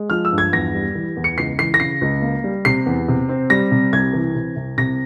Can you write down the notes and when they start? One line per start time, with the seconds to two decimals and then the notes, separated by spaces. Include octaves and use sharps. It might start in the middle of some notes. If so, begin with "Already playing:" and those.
Already playing: G#3
0.10 F3 F6
0.25 E6
0.32 G2
0.38 G#6
0.52 E2 A#6
0.74 G3
0.95 E3
1.17 E2
1.24 C#7
1.38 C#2 C7
1.59 E3 C7
1.74 A#6
1.80 C#3 C7
2.01 C#2
2.22 A#3
2.44 G3
2.65 C3 C7
2.86 E2
3.08 C3
3.29 C4
3.50 G3 A#6
3.71 C3
3.93 C2 G#6
4.13 E3
4.35 C3
4.56 C2
4.78 C3 A#6